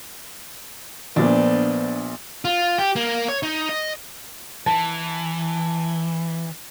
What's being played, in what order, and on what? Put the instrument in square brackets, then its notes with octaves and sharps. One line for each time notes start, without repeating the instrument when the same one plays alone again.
[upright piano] A#1 A#2 [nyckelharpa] B3 C5 [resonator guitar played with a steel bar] D4
[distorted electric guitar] F4
G4
A#3
C#5
D#4
D#5
[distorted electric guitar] E3 [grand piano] A5